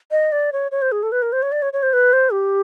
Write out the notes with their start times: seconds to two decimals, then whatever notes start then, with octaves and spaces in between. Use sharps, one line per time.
0.11 D#5
0.32 D5
0.53 C#5
0.72 C#5
0.82 C5
0.92 G#4
1.03 A4
1.12 B4
1.22 A#4
1.33 C5
1.42 C#5
1.52 D5
1.62 C#5
1.73 C#5
1.83 C5
1.93 B4
2.13 C5
2.32 G4